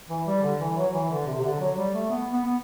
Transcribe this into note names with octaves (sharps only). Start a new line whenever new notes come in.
E3
G3
D3
E3
F#3
E3
D3
C3
C3
D3
F#3
G3
A3
B3
B3
B3